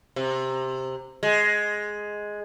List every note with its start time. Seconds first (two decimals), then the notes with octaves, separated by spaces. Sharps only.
0.16 C3
1.23 G#3